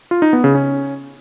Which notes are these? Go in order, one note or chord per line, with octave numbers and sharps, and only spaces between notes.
F4
D#4
B3
C#3
C#4